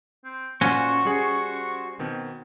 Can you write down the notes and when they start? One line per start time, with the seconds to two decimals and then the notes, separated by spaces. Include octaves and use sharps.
0.24 C4
0.61 A#2 C#4 F#4 C5 F#5 C#6
1.05 G3 G#4
1.99 B2 D#3 C4